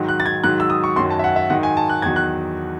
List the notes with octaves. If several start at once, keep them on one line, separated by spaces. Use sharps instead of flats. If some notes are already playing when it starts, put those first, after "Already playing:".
Already playing: G#2 D#3 F#3
F#6
A6
G#6
G#2 D#3 F#3 F#6
E6
D#6
C#6
F#2 D#3 F#3 C6
A5
E5
F#5
E5
G#2 D#3 F#3 F#5
G#5
A5
F#6
E2 D#3 F#3 G#6
F#6